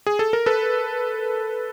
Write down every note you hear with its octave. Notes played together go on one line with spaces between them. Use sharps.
G#4
A4
A#4
A4 B4